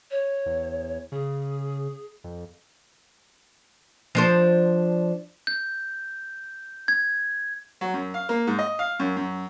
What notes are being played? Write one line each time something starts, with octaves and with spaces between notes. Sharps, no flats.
C#5
E2
C#3 G#4
F2
F3 D4 C5
G6
G#6
F#3
F#2
F5
A#3
G#2
D#5
F5
F#2
F#2